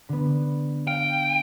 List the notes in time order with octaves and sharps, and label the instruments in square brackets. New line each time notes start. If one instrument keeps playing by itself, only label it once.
[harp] D3 B3
[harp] F5 [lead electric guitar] G5